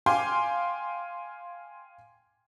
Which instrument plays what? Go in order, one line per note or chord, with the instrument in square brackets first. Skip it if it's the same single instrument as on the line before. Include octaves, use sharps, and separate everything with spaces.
[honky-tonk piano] F5 G5 G#5 C6 D6